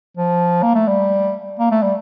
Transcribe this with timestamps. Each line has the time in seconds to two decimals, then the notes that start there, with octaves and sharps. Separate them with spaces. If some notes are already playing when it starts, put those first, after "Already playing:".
0.17 F3
0.63 A#3
0.75 A3
0.88 G3
1.59 A#3
1.71 A3
1.83 G3